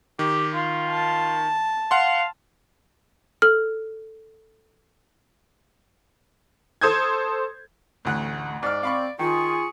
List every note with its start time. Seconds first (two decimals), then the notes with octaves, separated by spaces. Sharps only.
0.19 D#3 G4
0.54 F4
0.90 A5
1.91 F5 F#5 C6
3.42 A4 F6
6.81 A4 C5 D#6 G6 G#6
8.05 A1 D2 A3 F#6
8.63 G#2 D5 F6
8.83 C4 F5 B5 C#6
9.19 D#3 F4 G#4 C#6